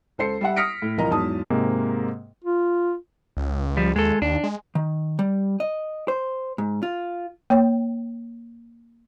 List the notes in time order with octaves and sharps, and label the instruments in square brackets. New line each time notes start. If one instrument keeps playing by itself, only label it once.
[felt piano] C#2 A4 C5 C7 C#7
G3 E5 F#5
D#6 F6 A#6 B6 C#7 D7
A2
C2 E3 F3 A#4 D#5 A#5
E2 G#2 F#3 A5 D#6
[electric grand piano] G#2 C3 G#3 A#3
[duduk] F4
[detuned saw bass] C#2
[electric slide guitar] F3 G3
[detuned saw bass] D#2 [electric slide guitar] G#3 A4
[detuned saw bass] D#2 [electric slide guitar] D4
[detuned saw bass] G#3
[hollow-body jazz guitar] D#3
G3
D#5
C5
G#2
F4
[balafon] A#3 C#5 G5